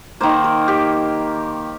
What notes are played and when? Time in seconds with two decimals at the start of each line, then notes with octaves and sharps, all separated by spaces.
0.21 D#3 A#3 C5
0.44 A#4
0.68 G4